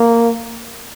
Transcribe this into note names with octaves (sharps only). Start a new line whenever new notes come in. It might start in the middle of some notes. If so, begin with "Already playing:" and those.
Already playing: A#3